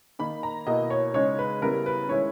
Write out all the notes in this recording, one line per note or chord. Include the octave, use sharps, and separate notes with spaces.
D#3 A#3 D#4 B5
A#5
B2 A#3 E4 D#5
C#5
C#3 G#3 D#4 C#5
B4
C#3 G3 B3 E4 A#4
B4
D#3 G#3 C#4 E4 C#5